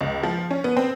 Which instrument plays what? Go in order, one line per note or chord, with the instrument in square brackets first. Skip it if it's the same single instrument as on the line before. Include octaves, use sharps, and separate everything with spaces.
[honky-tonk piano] C#2
F3
C#4
B3
C4